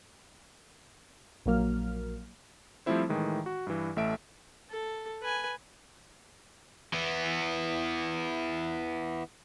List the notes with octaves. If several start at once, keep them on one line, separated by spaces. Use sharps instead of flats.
A#1 F#3 A#3 F6
F3 G3 A3 C4 E4 C5
A2 D#3 E3 G#3
F#4
G2 E3
A1 A3 E5 D7
A4
B4 G#5
E3 B3